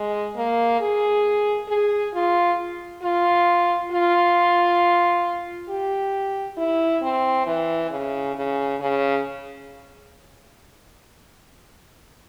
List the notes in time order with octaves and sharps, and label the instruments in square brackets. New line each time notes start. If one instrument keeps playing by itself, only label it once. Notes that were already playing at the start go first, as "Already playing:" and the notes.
Already playing: [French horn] G#3
A#3
G#4
G#4
F4
F4
F4
G4
E4
C4
E3
C#3
C#3
C#3